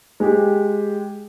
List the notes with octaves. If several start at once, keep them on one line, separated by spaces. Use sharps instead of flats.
G#3 G4